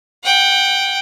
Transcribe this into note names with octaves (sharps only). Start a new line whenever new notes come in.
F#5 G5